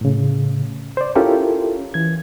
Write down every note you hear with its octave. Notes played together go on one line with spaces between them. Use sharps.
A2 C#3
C5 D5
C#4 E4 F4 G4 A4 A#4
E3 G#6